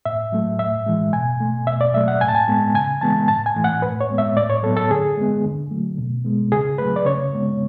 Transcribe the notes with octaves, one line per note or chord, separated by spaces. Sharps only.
A2 E5
F#3 A3
A2 E5
E3 G#3
B2 G#5
A3
B2 E5
D5
F#3 A3 E5
F#5
A2 G#5
A5
G#5
G#3 B3
C#3 G#5
E3 G#3 B3 A5
A2 A5
G#5
E3 A3
F#5
A2 B4
C#5
G#3 B3
E5
A2 D5
C#5
F#3 B3 A4
A4
D3 G#4
G#3 B3
D3
F#3 A3
B2
G#3 B3
C#3 G#4
F#3 A3 B4
D5
C#3 C#5
G#3 B3